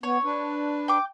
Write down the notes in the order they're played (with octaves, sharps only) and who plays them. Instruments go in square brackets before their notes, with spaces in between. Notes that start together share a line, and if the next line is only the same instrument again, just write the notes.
[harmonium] B3 [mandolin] C#5
[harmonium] D4 B4
[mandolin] G5 D6